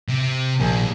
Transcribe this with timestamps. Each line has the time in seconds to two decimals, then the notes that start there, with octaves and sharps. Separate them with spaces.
0.09 C3
0.60 A#1 D#2 G#5